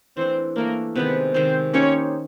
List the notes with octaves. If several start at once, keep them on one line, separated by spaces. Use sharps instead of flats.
E3 A3 C4 D4 C5
E3 A3 A#3 D4 A#4
C3 D#3 G#3 B3 B4
C3 D#3 G#3 C4 C5
A#3 C#4 D#4 G4 C5 C#5